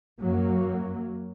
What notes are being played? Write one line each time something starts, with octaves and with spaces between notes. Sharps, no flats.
F#2 F#3 A#3